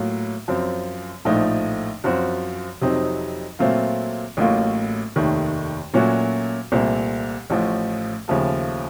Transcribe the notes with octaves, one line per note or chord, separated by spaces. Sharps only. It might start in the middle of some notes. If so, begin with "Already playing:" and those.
Already playing: A2 F#3 A#3 F4
F#2 F3 C4
A#1 A2 F3 A3 D#4
F#2 F3 C4 F#4
F2 C3 F#3 C4 D#4
A#2 F#3 A3 C4 F4
A1 A2 F#3 A#3 F4
F1 D#2 D#3 A3
A#2 F#3 A3 C#4 F#4
C2 A#2 A3 C4
A1 A2 F3
D#2 C#3 F3 A3